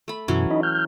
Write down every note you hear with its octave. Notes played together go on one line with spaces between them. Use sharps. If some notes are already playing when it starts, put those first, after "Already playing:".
A3 B5
F#2 B2 E3 F#3 C#4
D#4 D#5 B5
F6 G6